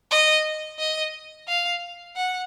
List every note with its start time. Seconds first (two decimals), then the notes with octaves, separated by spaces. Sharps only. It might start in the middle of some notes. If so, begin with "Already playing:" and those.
0.11 D#5
0.79 D#5
1.48 F5
2.16 F#5